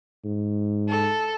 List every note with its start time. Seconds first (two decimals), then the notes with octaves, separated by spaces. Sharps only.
0.24 G#2
0.88 A4